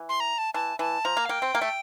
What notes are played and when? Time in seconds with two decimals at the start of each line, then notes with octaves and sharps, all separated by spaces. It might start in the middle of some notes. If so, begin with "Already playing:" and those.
Already playing: E3
0.09 C6
0.20 A#5
0.38 A5
0.54 E3 A5
0.79 E3 A5
1.05 F3 A#5
1.17 A#3
1.25 F5
1.29 A#3 G5
1.42 C4
1.55 A#3
1.61 A3